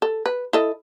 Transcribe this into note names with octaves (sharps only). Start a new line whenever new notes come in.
A4
B4
E4 A4 D#5